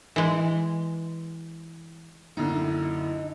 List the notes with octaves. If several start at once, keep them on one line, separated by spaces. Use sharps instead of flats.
E3 G#3
A#1 F#2 D3 D#4 E4